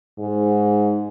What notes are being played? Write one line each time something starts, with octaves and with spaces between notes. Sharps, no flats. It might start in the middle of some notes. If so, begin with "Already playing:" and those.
G#2